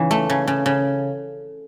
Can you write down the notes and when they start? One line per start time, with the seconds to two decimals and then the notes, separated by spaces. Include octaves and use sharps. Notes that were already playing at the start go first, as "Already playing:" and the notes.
Already playing: C#3 E3
0.11 A3
0.30 C#3
0.47 C#3
0.66 C#3